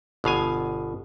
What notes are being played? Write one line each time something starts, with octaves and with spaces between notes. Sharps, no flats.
G1 B2 F5 G#5